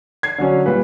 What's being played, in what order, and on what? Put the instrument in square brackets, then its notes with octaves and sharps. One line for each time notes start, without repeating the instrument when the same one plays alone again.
[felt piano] G#6 C7
[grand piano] D3 F#3 C#4
[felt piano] A#2 G3 [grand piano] B4